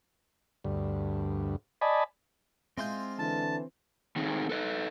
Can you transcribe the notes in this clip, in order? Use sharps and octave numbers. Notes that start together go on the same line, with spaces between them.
D2 G2
D5 D#5 G#5 A5 B5
G#3 C4 E4 F4 C6 G6
D3 E3 A5
D#3 A3 C4 D#4 G#4
A4 B4 D#5